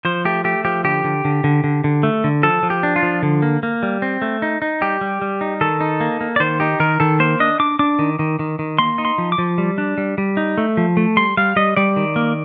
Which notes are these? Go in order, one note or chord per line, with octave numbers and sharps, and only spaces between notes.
F3 C5
A3 G4
A3 G4
F3 G4
D3 G4
D3
D3
D3
D3
D3
A3
D3
F3 A4
F3
G4
D4
F4
F3
D3
A#3
A#3
G3
C4
A3
D#4
D#4
G3 G4
G3
G3
D#4
D#3 A4
D#4
A#3
A#3
D5
D#3 C5
D#4 G4
D#3 A#4
D#3 A4
A#3 C5
D4 D#5
D4 D6
D4 D6
D#3
D#3
D#3
D#3
A#3 C6
D#4
C6
F3
D6
F3
G3
D4
G3
G3
D#4
A3
F3
A3
G3 C6
G3 F5
G3 D#5
G3 D5
D#3
A#3